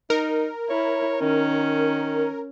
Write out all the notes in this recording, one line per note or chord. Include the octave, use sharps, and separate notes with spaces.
D#4 A#4
E4 C#5
D#3 C#4